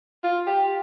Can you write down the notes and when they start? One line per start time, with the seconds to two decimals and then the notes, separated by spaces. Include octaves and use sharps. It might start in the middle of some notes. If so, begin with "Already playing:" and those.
0.24 F4
0.47 G4